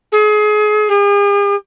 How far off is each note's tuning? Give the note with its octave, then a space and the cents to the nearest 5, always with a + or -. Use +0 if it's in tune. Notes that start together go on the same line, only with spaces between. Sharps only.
G#4 +30
G#4 -45